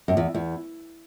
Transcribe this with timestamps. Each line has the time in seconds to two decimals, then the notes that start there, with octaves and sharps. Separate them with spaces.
0.08 F#2
0.17 E2
0.34 E2